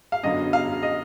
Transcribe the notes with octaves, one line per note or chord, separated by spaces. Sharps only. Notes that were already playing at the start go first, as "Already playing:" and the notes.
F5
F#2 D3 F#3 B3 D#5
F5
D#5